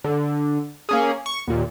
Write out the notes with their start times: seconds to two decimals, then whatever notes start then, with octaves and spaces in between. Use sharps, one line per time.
0.04 D3
0.89 A#3 C#4 G#4
1.26 C#6
1.47 D#2 A#2